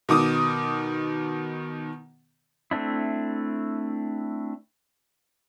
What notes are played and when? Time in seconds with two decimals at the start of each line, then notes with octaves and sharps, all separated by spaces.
0.09 B2 D#3 D6 D#6
2.71 A3 C4 D4 E4